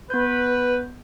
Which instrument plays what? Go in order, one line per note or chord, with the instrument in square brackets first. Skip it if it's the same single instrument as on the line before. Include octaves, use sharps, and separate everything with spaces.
[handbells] B3 G6 [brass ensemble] B4